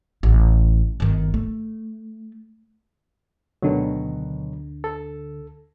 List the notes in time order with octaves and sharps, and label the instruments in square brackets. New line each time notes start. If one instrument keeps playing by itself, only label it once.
[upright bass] A1
G1 D#3
A3
[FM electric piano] D2 D3 [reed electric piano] B2 D#3 F#3
[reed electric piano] A4